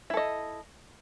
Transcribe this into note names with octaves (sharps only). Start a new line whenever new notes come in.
E4 A4 D#5